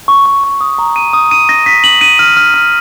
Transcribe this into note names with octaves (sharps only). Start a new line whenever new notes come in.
C#6
C#6
C#6
D#6
A#5
D#7
D#6
D#7
A#6
B6
F#7
D#7
F6
F6
F6